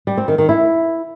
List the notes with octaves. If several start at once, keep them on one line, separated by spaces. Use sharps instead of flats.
G3
C4
D#3
D#3
E4